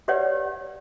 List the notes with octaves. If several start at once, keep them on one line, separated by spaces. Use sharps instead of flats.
G4 B4 C#5 D5 F#5